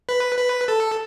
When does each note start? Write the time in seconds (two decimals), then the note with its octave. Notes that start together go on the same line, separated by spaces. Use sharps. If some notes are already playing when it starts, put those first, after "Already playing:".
0.09 B4
0.38 B4
0.68 A4